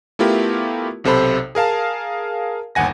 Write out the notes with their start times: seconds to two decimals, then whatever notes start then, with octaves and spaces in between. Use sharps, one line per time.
0.19 A3 B3 E4 F4 G4 A#4
1.04 B1 C3 A4 C5 B5
1.55 G#4 A#4 F5 A5
2.75 G1 D#2 F#5 G#5 A#6